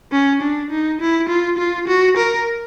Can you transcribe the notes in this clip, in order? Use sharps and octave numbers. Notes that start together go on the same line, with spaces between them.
C#4
D4
D#4
E4
F4
F4
F#4
A#4